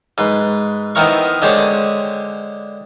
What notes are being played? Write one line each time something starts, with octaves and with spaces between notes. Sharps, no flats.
G#2 B4 C6
D#3 B3 C4 E4 A#4 C#6
D3 G#3 G4 G#4 C5 C#5